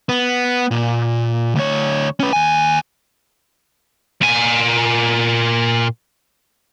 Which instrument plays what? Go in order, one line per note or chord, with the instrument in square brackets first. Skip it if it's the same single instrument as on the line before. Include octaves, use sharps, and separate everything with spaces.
[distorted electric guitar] B3
A#2
D2 C#5
C#4 B4
D#2 G#5
A#2 G#5